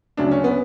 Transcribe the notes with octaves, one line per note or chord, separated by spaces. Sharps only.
D2 C#3 F#3 D4
C#4
B3